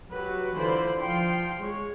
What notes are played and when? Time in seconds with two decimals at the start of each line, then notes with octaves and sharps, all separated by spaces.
0.11 F#3 F#4 G4 B4
0.54 D3 E3 F4 C5 D5 B5
0.99 F3 F5 G5 C6
1.59 G#3 C#5